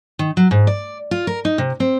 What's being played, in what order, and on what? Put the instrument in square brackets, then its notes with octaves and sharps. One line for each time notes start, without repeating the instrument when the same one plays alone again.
[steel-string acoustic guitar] D#3
F#3
G#2
D5
F4
A#4
D#4
C3
C4